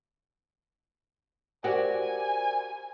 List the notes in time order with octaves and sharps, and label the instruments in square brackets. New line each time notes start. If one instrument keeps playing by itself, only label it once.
[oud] F#4 G4 [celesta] A#4 C5 D5 [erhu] G#5